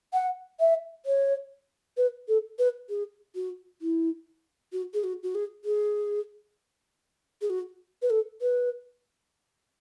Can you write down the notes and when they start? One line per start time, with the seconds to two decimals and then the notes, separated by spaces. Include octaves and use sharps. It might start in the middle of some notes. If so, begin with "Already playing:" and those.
0.13 F#5
0.60 E5
1.06 C#5
1.97 B4
2.28 A4
2.59 B4
2.89 G#4
3.35 F#4
3.82 E4
4.73 F#4
4.94 G#4
5.04 F#4
5.23 F#4
5.35 G#4
5.65 G#4
7.41 G#4
7.50 F#4
8.02 B4
8.10 A4
8.41 B4